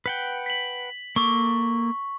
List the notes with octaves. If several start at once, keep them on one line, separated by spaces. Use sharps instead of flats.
B4 F#5 G5
B6 F#7
A#3 A4 C#6 D6